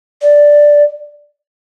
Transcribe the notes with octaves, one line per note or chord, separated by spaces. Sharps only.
D5